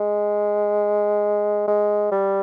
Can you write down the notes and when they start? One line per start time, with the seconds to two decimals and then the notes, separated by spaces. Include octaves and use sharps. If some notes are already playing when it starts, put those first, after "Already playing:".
Already playing: G#3
1.68 G#3
2.12 G3